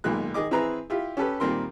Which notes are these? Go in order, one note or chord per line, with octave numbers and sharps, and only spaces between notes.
B1 A#2 D#3 G#3 F#6
D#3 G#4 D#5 D6
E3 C4 E4 G#4 B4 A#5
E4 F4 G4
C#4 G4 A4 B4
A#2 D#3 G3 C4 A#4 C6